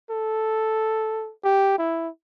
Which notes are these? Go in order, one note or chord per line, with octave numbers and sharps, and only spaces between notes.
A4
G4
E4